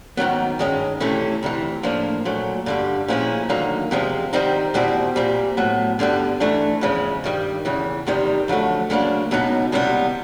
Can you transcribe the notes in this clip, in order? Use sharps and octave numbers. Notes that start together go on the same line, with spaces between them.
G#2 D#3 F#3 B3
G2 D#3 G#3 C#4
C3 E3 A3 C#4 E4
D2 C3 E3
A2 F3 A#3 D4
A#2 F#3 A3
G2 D3 G3
A#2 F3 G#3 C#4 E4
D#2 D3 F#3 A#3 D#4
E2 C3 F3 G#3
G#2 D#3 G3 C4 D#4
E2 B2 G3 C4 E4
A#2 G3 C4
A2 F#3 B3
G2 D3 G3 B3
G#2 E3 A3 D4
E2 C#3 F3 G#3
G2 D#3 G3
E2 C#3 E3
E2 C3 D#3 G3
F2 D3 F#3 A3
D2 C#3 F#3 A#3 D4
C#2 B2 F#3 B3 D#4
C#2 C3 E3 G3 B3